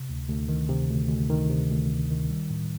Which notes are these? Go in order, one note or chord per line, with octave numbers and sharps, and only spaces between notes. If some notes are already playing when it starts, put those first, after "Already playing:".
Already playing: C3
D2
D2
D#3
C3
D2
D2
D#3
C3
D2
D2
D#3
G3
A2